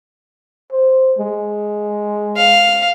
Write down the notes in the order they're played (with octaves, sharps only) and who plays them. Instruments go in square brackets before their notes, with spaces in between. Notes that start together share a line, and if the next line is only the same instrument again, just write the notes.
[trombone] C5
G#3
[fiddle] F5